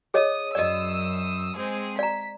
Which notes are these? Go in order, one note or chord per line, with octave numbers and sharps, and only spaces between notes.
G#4 C#5 D#5 D#6
F#2 D5 D#5 D#6 E6
G#3 C4 G#4
D5 A#5 B6